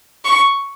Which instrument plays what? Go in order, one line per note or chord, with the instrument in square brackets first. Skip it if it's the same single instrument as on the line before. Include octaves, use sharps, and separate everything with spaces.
[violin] C#6